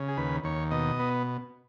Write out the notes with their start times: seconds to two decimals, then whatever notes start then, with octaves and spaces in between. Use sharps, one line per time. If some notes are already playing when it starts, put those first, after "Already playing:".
Already playing: C#3
0.08 G#4
0.17 D#2 B4
0.44 D#2 C#5
0.71 B2 D#5
0.99 B3